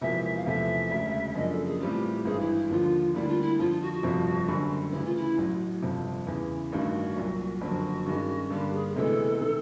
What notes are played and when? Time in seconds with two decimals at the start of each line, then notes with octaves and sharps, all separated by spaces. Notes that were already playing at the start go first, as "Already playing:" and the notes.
0.01 E1 E2 C3 F3 A#3 E5
0.24 E5
0.36 F5
0.46 E2 C3 F3 A3 E5
0.91 E1 D2 C#3
1.35 F#2 C#3 F3 A#3 D4 D#5
1.50 A4
1.65 G#4
1.80 A2 E3 G3 C4 F4 G4
2.25 G#1 G2 E3 G#4
2.40 E4
2.54 E4
2.70 D#2 D3 F3 F4
3.14 D2 D3 G3 A#3 D4 E4
3.27 F4
3.41 E4
3.59 F2 D3 F3 F4
3.70 F4
3.82 F#4
3.92 F#4
4.03 G1 F2 C3 F3
4.48 F#1 F#2 D3 G3
4.92 D2 C#3 E3 E4
5.04 F4
5.16 E4
5.38 A1 A2 F#3
5.82 G1 F2 C3
6.27 E2 C#3 E3
6.72 A1 G2 D#3 F#4
7.17 C2 A#2 F#3
7.61 F#1 F2 D3 F#3 F#4
8.06 G2 D#3 G#3 C#4
8.50 G2 D3 G3 A#3 G4
8.73 G#4
8.88 G#4
8.95 D2 C3 E3 G#3 B3 A4
9.41 C3 D#3